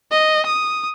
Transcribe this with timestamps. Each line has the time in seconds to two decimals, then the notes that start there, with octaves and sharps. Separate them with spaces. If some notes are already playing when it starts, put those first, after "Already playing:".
0.11 D#5
0.46 D#6